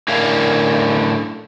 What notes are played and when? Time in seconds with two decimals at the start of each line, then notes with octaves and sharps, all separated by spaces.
0.08 A2 D3 C#4 A#4 F5